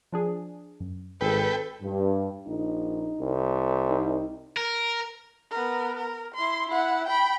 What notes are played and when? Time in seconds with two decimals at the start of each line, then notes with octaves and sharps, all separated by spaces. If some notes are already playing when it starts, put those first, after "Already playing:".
0.12 F3 D4 G#4
0.80 F#2
1.21 G#1 G#4 A4 B4 G5
1.82 G2
2.48 A#1 D#4
3.20 C2
3.88 D#4
4.57 A#4
5.51 B3 A#4
5.96 A#4
6.34 E4 C6
6.69 E4 F#5
7.07 G5 B5